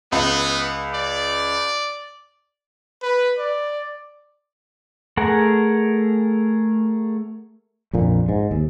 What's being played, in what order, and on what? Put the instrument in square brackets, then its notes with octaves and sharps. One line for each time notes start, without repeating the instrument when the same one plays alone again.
[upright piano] C#2 [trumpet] B3
[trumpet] D5
B4
D5
[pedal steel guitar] A3 G#4 A#4 F#5
[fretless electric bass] A#1 F2 A#2
G#2
D#2